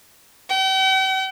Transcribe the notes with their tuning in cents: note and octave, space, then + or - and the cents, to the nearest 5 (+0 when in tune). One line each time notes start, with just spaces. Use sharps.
G5 -45